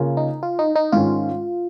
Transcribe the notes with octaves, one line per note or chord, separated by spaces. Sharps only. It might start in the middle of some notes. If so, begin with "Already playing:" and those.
Already playing: C#3 A#3 F4 A#4
D#4
F4
D#4
D#4
G#2 D#3 C#4 F4